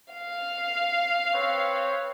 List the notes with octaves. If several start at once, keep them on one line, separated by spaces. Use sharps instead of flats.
F5
C4 B4 C#5